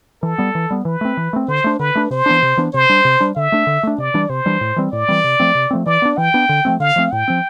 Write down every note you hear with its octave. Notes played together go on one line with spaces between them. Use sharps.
E3 A4
G3 B3
E3
G3 B3
E3 B4
A3 C4
E3
A3 C4
D3 C5
A3 D4
D3 B4
A3 D4
C3 C5
E3 B3 D4
C3
E3 B3 D4
C3 C5
G3 D4
C3
G3 D4
D3 E5
A3 D4
D3
A3 D4
C3 D5
E3 G3 D4
C3 C5
E3 G3 D4
A2
E3 G3 C4
A2 D5
E3 G3 C4
C3
F3 A3 C4
C3
F3 A3 C4
E3 D5
B3 D4
E3 G5
B3 D4
D3
F3 A3 C4
D3 F5
F3 A3 C4
A2 G5
F3 C4